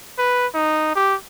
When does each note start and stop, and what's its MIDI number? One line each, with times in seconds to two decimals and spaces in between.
0.18 0.47 71
0.54 0.94 63
0.96 1.15 67